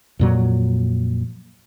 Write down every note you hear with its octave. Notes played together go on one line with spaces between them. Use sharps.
F2 A#2 F#3